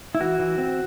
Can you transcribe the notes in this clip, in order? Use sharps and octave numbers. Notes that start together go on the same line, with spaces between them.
E4
E3 F#4
E3
C4